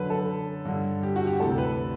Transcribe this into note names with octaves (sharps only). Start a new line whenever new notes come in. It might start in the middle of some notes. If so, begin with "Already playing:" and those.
Already playing: F#2 D3 B4
A4
G2 D3
G4
F#4
G4
D2 C3 E3 A4
B4